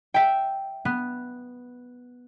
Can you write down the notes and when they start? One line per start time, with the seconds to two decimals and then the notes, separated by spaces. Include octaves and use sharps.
0.14 E5 G5
0.85 B3